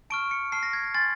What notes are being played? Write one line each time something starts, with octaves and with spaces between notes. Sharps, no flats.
A5 C#6 F6 D7
C#7
A5 C#6 F6 C7
A#6
G#6
G#6
G#5 C6 F6 A6